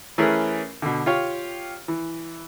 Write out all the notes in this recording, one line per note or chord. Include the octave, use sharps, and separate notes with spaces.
E3 A3 C#4 G#4 A#4 B4
B2 D3
F4 G4 C#5 F5
E3